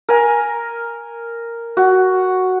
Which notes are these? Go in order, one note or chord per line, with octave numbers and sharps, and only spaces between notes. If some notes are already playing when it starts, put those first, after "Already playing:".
A#4 G#5
F#4